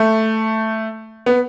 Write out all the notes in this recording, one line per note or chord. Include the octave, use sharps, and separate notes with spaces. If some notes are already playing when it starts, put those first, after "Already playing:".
Already playing: A3
B3